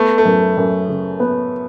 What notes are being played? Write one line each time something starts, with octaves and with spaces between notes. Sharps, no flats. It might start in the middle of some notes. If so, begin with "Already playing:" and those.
Already playing: A3 B3
A3
F#2
F#2
C#3
B3